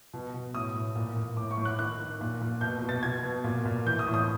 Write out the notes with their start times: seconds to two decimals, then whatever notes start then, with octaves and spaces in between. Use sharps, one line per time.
0.14 B2
0.34 B2
0.54 A2 D#6
0.75 A2
0.96 A#2
1.16 A#2
1.37 A2 D6
1.51 C#6
1.58 A2
1.65 F#6
1.79 D#3 F#6
1.99 D#3
2.21 A#2
2.42 A#2
2.61 B2 G6
2.82 B2
2.89 A6
3.03 B2 G#6
3.23 B2
3.44 A#2
3.65 A#2
3.85 E3 G6
3.99 D#6
4.07 A2
4.14 D#6